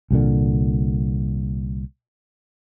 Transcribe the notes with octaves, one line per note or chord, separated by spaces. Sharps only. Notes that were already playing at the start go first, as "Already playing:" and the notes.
C2 A#2 D3